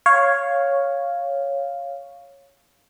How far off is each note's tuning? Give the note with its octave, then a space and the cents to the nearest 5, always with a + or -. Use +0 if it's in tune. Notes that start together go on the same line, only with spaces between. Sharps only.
C#5 +0 F5 +0